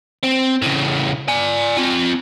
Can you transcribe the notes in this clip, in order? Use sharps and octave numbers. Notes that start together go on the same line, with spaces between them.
C4
A2 C#3
D5 G#5
C4 F4